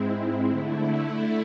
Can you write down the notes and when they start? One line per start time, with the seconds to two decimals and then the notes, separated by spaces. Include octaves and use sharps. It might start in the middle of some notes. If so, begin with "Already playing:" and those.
Already playing: G#2 G#3 C4 E4
0.47 D3 A3 E4